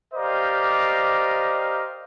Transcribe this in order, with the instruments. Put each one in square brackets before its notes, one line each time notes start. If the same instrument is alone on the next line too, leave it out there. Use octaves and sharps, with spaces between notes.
[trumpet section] G4 A#4 C5 D5 D#5 F5